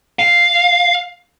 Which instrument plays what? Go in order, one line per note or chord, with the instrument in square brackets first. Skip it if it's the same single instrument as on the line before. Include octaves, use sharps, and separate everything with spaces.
[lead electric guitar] F5